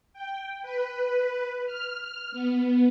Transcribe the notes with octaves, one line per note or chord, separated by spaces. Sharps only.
G5
B4
F6
B3